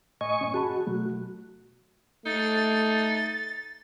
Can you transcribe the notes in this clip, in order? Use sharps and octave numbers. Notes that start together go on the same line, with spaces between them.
A2 D#5 G#5 C#6
G2 A#2 C#4
F#4 G#4 A5 B5
B2 F#3 A3
A3 D#4 A6